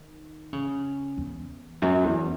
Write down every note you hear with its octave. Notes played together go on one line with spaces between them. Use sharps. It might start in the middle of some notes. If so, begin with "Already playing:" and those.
Already playing: D#3
C#3
E2
F#2
E2